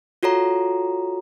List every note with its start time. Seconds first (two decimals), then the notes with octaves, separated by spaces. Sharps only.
0.23 F4 F#4 A4 C#5 A#5